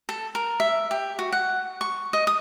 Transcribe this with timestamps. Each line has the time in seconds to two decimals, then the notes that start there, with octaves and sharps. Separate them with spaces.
0.09 A4
0.35 A#4
0.60 E5
0.91 G4
1.19 F#4
1.32 F#5
1.81 C#6
2.13 D#5
2.27 D#6